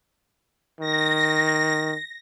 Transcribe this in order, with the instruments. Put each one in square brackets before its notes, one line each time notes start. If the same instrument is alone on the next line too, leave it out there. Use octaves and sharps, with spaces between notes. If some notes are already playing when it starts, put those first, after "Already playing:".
[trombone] D#3 [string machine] A#6